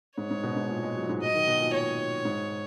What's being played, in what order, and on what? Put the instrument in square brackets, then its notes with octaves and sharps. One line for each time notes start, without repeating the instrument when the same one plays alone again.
[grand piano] G#2 [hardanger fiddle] C#5
[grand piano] G#2
B2
G#2
A#2
G#3
F#3
A#2
G#2
[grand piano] F#3 [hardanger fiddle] D#5
[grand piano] D#3
B2
A#2
[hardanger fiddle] C#5
[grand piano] G#2